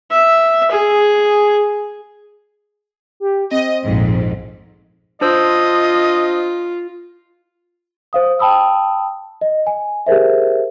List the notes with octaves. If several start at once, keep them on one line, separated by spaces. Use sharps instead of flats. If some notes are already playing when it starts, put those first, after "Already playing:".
E5
G#4
G4
C4 D#5
A#1 F2 G#2
D4 F4 C5 D#5 E6
C5 F5 D#6
G5 A5 B5 D#6 E6
D#5
G#5
G4 G#4 A#4 C5 E5